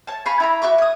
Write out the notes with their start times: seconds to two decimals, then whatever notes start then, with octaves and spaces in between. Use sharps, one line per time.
0.07 C#5 A5
0.26 F5 G#5 B5 C#6
0.40 E4 A#5 B5
0.62 F#4 E5 C#6 D6
0.78 C#5 D#6